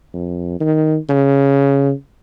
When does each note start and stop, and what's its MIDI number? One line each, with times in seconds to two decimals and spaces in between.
0.13 0.59 41
0.60 0.97 51
1.09 1.92 49